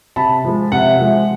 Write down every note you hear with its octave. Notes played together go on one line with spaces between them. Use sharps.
C3 A5 B5
F3 G#3
C3 E5 F#5
F3 G#3